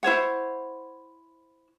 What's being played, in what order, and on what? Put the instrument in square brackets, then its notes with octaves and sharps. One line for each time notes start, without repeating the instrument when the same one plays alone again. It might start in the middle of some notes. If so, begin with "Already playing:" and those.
[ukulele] E4 C5 C#5 F#5